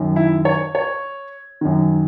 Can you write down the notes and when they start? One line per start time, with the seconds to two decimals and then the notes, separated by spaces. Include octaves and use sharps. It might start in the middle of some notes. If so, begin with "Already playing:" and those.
Already playing: F#2 D#3
0.16 E4
0.45 C#5
0.75 C#5
1.61 F#2 D#3